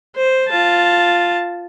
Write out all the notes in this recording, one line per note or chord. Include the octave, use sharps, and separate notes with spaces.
C5
F4 A5